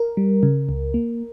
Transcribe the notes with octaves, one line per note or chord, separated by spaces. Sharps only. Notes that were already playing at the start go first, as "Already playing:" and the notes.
Already playing: A#4
G3
C#3
C#2
A#3